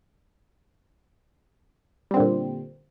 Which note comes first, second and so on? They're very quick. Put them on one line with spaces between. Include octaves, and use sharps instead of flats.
G3 C4 D3 A#2